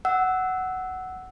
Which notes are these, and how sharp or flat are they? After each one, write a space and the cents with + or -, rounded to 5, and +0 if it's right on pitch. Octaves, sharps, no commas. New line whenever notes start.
F#5 +10 E6 -10